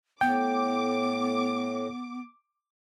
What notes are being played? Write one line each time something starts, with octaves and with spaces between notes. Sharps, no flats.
A2 B3 G5 D6